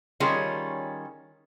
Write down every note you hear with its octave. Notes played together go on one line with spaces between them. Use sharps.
D#3 G3 C#4 F4 G#4 C#5